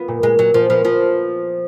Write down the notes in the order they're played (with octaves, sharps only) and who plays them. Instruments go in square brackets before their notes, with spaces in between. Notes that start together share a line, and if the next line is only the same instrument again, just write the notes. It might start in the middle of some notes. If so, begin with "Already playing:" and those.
Already playing: [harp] B3 F4
A#2
[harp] A#2 [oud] G#3
[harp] A#2 [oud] F#3
[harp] A#2 [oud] F3
[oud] F3 [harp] B3
[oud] F3 [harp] B3